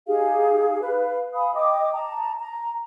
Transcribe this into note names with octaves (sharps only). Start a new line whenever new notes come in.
D#4 G4 G#4 F5
B4 F5
F5 G#5 B5 D#6
D#5 G5 D6 D#6
A5 A#5
A#5